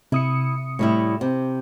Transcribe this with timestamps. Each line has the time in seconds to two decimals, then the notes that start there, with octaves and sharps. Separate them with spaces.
0.12 C3 E4 D#6 C#7
0.79 A2 G3 E4
1.21 C3